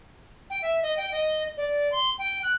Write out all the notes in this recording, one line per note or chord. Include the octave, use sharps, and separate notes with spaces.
G5
E5
D#5
G5
D#5
D5
C6
G5
F#6